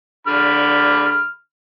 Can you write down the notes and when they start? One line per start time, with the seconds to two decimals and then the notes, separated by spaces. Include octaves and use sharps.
0.27 D3 B5 F6